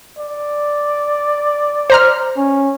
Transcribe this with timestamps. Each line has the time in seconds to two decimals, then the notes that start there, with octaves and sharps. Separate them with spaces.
0.18 D5
1.90 C5 A#5 F6
2.37 C#4